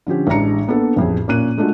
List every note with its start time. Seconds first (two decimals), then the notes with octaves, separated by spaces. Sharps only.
0.07 D3 F3 C#4 G4
0.27 A1 G#3 D4 A#5 C#7
0.68 A#3 B3 D4 A4
0.96 A1 F2 G#4
1.28 A#2 A#3 C#4 F#6 D#7
1.58 G#3 A3 D4 F4 F#4